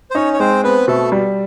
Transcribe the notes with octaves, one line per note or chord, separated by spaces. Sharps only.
C5
C#4 D#4 C#5
C#5
G#3 C4 C5
B3 C4 B4
B2 A3 A4
G3